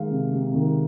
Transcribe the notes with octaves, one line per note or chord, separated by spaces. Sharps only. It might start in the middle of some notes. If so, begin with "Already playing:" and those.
Already playing: D#3 G#3 F5
C3
C3
D#3